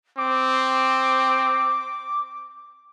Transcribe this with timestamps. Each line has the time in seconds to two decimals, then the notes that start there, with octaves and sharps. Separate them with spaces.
0.18 C4 D6